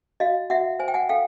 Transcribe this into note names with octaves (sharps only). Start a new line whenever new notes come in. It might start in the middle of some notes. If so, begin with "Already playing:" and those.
F#4 D#5 F5
F#4 E5 F#5
C5 G#5
G5
F#5 G#5
A4 F5 G5